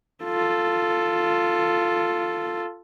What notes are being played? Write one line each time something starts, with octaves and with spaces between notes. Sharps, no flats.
F4 A4